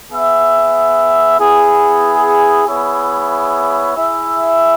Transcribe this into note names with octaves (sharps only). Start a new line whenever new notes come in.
B3 G#4 E5
B3 E4 G#4
B3 E4 G#4 C#5 E5
E4 G#4 E5